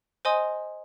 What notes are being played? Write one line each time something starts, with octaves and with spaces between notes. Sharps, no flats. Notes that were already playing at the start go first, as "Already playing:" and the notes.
C5 D#5 G#5 C6 D#6